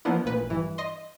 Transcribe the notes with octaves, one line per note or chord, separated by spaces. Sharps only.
E3 F3 A#3 B3 D4 E4
A1 A#2 B4
G2 E3
D#5 C6